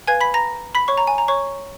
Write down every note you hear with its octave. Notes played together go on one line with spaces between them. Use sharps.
B4 F5 G#5 G#6
B5 B6
A#5 A#6
B5 B6
C#5 C#6
A#5
G#5
A#5
C#5 C#6